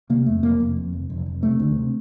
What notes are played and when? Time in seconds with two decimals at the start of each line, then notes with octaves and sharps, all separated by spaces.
0.10 C3 A#3
0.26 F2 A3
0.43 F1 A#3
0.60 F1
0.77 F2
0.93 F1
1.10 F1
1.26 F1
1.42 C3 A3
1.59 D2
1.76 C3